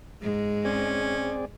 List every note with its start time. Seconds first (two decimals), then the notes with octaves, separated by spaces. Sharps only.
0.22 G#2 G#3
0.65 C4 C#4 G#4 D5